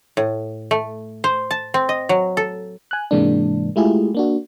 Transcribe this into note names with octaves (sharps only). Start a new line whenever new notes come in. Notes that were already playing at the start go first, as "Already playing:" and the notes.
A2
A3
C5
A5
C4
D#5
F#3
A4
G#5 F#6
G#2 C3 E3 G#3 A#3 D4
G#3 A3 E4 F4 G4 G#4
A#3 D4 F#4